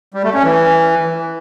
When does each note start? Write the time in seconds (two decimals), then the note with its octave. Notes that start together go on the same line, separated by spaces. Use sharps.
0.14 G3
0.24 A3
0.34 C#4
0.44 E3